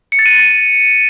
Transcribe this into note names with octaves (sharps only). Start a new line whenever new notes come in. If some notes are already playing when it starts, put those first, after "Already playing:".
C#7
A6
D#7